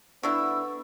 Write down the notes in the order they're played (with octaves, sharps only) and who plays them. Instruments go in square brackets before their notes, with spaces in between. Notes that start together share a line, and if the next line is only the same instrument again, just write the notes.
[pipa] D3 D4 E4 [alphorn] B3 [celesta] C#6 [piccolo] E6